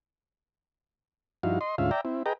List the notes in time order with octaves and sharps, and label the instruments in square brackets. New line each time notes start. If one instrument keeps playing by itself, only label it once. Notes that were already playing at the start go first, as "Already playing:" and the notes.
[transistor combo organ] G2 F3 D#4 E4 F#4 F5
D#5 C6
D2 G#2 C#4 F4 E5 F5
D5 E5 G5 A#5
C4 E4
G#4 B4 D#5 G5 A#5